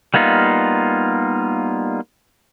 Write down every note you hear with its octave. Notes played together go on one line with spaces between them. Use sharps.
G3 A#3 B3 D#4 F4